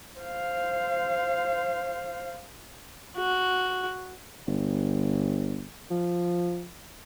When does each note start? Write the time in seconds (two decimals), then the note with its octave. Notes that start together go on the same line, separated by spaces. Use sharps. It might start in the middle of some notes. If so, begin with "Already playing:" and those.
0.20 C5 F5
3.17 F#4
4.47 G1
5.91 F3